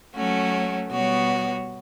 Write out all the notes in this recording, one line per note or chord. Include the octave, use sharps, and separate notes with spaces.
F#3 A3 C#4 F#4 C#5
B2 G3 B3 F#4 C#5